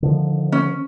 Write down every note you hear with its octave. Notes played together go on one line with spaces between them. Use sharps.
D3 D#3 F3
C#4